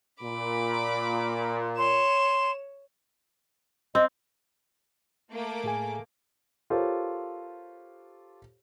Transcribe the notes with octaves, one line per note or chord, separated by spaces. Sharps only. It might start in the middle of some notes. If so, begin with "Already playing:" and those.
A#2 B5 D6
C#5 C6 E7
C4 D#5
A3 A#3 D6
A2 G#4 G#5
F4 G4 A4 A#4 C5 C#5